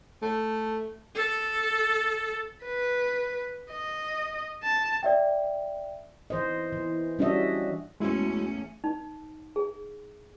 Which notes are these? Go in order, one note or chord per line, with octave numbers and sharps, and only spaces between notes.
A3
A4
B4
D#5
A5
D5 E5 G5
E3 C5 D#5
E3
G3 C#4 D4 F#4 D#5 E5
E2 G#3 A3 C#4 E4 F#4
D#4
G#4